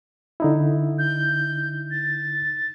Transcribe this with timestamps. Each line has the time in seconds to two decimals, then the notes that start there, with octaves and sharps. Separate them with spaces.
0.40 D3 D#4 E4
0.99 G6
1.91 A6